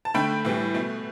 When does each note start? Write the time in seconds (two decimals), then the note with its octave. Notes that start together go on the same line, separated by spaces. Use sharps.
0.05 A5
0.14 D3 A3 G5 B5
0.45 A2 E3 G3
0.75 B2 A3